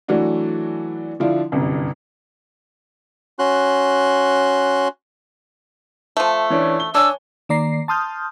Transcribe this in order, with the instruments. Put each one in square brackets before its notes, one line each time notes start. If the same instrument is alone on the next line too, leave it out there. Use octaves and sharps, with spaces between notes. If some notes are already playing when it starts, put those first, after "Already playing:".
[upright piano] E3 F#3 A3 D4 F#4
D3 F3 D4 E4 F4
G1 C2 F#2
[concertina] C#4 F#4 C6 F#6
[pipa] F3 A3
[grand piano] E3 C#4 D4
G7
[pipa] D4 [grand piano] C#5 G#5 [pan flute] E6
[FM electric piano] D#3 A#3 D5 A#5 C7
A5 C6 D#6 F6 G6